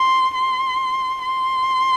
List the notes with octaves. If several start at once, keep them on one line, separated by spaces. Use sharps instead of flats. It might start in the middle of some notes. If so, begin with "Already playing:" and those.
Already playing: C6
C6
C6